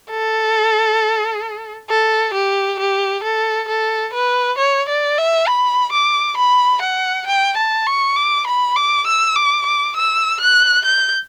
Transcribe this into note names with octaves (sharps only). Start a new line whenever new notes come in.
A4
A4
G4
G4
A4
A4
B4
C#5
D5
E5
B5
D6
B5
F#5
G5
A5
C#6
D6
B5
D6
E6
D6
D6
E6
F#6
G6